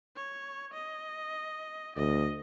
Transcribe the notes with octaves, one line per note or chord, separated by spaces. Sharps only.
C#5
D#5
D2 D#5